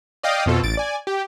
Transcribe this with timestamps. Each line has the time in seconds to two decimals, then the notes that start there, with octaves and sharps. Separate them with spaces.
0.23 D5 D#5 F5 G5 D#6
0.46 F2 B2 F4 A4
0.63 A1 A6 D7
0.77 D5 G#5
1.07 G4